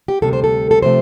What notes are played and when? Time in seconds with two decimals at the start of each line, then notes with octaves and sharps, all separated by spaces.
0.08 G4
0.22 D2 C3 G3 A4
0.33 C5
0.44 A4
0.71 A4
0.82 C3 F3 A3 C5